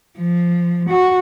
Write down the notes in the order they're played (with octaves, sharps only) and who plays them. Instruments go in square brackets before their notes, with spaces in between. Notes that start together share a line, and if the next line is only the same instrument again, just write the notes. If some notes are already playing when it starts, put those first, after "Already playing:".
[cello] F3
F#4